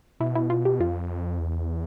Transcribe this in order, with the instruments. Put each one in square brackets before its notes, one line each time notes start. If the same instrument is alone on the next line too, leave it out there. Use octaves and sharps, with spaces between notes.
[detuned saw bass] B2 [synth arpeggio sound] E4
[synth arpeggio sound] E4
F4
G4
[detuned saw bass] F2 [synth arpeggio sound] F4
[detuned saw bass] E2